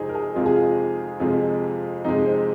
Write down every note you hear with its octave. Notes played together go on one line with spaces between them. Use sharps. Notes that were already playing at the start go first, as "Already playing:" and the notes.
Already playing: F2 C3 F3 G#3 C4 D#4 G#4
A#4
G#4
F2 C3 F3 G#3 F4
G#4
F4
F2 C3 F3 G#3
F2 C3 F3 G#3 D#4
C4